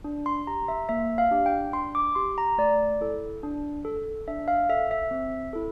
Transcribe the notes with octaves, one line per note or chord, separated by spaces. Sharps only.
D4
C6
G4 A#5
E5
A#3 E5
F5
D4 G4
G5
D4 C6
D6
G4 C6
A#5
A3 D5
E4 A4
D4
A4
D4 E5
F5
A4 E5
E5
C4
E4 A4